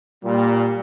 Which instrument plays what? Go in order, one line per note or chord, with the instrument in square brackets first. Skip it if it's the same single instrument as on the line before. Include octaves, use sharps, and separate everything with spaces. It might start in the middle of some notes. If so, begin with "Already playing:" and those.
[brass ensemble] A#2 [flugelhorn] G3